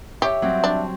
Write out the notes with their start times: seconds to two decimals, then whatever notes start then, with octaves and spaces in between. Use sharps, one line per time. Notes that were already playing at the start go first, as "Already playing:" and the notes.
0.22 G4 C#5 E5
0.42 F#3 G3 C4
0.64 D4